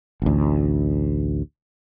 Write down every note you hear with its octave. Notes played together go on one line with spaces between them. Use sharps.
A1 D2